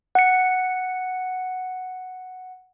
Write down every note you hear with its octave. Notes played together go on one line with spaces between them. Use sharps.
F#5 C#7